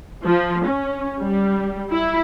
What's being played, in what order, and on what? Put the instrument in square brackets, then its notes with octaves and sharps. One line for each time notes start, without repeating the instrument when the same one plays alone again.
[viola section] F3
C#4
G3
E4